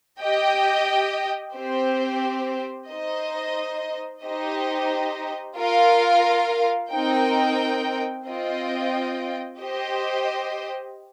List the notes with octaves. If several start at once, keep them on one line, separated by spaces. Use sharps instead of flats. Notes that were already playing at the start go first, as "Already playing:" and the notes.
G4 D#5 G5
C4 G4 C5
D#4 C5 D#5
D#4 G4 C5 D#5
F4 A#4 F5
C4 D#4 A#4 G5
C4 F4 D#5 G5
G4 C5 D#5